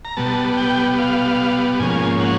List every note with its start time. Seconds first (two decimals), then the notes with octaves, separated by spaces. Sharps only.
0.05 A#5
0.17 B2 G3 B3 A5
0.57 G5
0.99 F5
1.80 G#2 F3 A#3 C#4 G#5
2.20 F#5